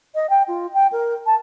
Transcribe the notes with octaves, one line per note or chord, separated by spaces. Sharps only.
D#5
G5
F4
G5
A#4
A5